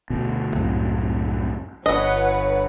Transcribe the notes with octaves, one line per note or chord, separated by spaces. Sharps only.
D2 B2 B3
C2 F#2 A2
G1 B4 C#5 D#5 F#5